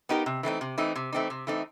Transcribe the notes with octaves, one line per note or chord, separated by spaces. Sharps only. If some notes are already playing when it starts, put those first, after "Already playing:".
B3 D#4 G4 A#4
C3
E3 A3 C4 D#4
C3
E3 A3 C4 D#4
C3
E3 A3 C4 D#4
C3
E3 A3 C4 D#4